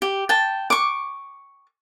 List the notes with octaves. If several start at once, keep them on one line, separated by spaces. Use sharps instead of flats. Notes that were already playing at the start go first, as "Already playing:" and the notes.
G4
G5 A5
C#6 D6